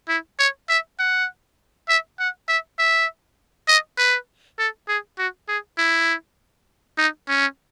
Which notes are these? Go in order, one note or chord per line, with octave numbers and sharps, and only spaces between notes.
E4
C#5
E5
F#5
E5
F#5
E5
E5
D#5
B4
A4
G#4
F#4
G#4
E4
D#4
C#4